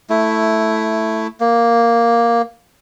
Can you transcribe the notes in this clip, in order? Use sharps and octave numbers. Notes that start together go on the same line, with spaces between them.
A3 E4
A#3